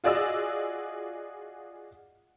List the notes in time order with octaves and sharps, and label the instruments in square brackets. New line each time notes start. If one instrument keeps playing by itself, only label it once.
[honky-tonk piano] F4 F#4 G#4 D5 D#5 E6